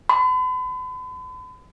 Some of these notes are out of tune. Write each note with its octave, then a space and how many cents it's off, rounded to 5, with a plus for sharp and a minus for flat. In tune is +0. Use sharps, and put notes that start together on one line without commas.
B5 +45